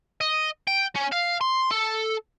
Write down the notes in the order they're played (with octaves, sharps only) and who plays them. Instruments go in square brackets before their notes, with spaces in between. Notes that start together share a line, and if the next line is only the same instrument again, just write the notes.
[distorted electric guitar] D#5
G5
C#4
F5
C6
A4